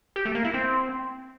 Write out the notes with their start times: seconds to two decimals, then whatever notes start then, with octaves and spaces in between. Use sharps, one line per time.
0.16 G4
0.25 A3
0.35 A#3
0.45 E4
0.54 C4